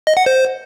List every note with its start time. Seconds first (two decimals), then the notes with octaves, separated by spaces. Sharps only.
0.07 D#5
0.17 F#5
0.26 C5